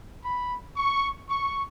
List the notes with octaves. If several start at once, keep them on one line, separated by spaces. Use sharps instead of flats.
B5
C#6
C#6